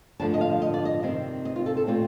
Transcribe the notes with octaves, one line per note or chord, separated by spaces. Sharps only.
G2 D3 F3 A3 A5
D#5
F5
D#5
D5
D#5
C3 D#3 G3 C4
D#5
F4
A4
A4
A#2 A3 C4 F4